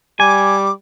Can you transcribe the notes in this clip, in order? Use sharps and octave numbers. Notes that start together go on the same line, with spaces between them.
G3 G#5 D6